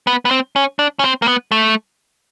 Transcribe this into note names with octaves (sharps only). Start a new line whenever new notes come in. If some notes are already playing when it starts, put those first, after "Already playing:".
B3
B3
C4
C#4
D4
C#4
C4
A#3
B3
A3